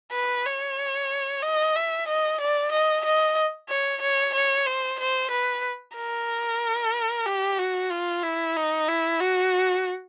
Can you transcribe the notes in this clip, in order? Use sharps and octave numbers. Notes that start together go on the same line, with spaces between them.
B4
C#5
D#5
E5
D#5
D5
D#5
D#5
C#5
C#5
C#5
C5
C5
B4
A#4
G4
F#4
F4
E4
D#4
E4
F#4